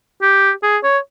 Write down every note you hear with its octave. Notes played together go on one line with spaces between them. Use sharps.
G4
G#4
C#5